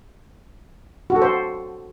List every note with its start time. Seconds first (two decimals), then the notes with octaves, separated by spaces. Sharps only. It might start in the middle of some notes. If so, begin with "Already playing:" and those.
1.10 F#4
1.16 A4
1.22 C5